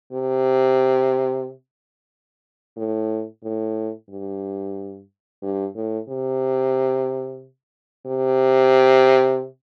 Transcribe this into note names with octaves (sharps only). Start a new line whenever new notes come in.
C3
A2
A2
G2
G2
A2
C3
C3